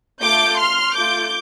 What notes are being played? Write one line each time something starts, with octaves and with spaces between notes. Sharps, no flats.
A3 F4 A4 D6 G6
C6 F6
A3 F4 A4 D6 G6